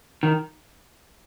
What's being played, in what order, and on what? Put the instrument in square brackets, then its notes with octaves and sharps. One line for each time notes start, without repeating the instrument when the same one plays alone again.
[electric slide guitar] D#3